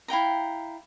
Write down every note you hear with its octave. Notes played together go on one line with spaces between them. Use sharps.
E4 F5 G5 A#5